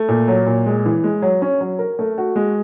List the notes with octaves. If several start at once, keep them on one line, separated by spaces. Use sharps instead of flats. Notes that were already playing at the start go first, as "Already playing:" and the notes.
Already playing: A3
A#2
F#3
A#2
G#3
E3
G#3
F#3
C#4
F#3
A#4
A3
F#4
G#3